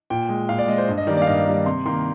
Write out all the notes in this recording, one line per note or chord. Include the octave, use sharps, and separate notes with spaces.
A#2 G5
G#3
A#2 F5
D5
G#3 D#5
C5
G2
D#5
D#3 G3 A#3 D5
D5
F5
G2 D#5
D#3 G3 A#3
C3 C6
D#3 A#3 C6